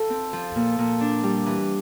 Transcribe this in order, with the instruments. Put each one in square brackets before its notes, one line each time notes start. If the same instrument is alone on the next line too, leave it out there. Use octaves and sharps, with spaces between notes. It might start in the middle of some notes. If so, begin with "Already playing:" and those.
Already playing: [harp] F4 [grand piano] A4
[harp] C4
F3
A#2
A#2
D4
G3
E3